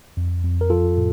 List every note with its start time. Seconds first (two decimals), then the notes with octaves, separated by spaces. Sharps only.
0.17 F2
0.44 F2
0.61 A#4
0.70 F3 F4 A4
0.98 A2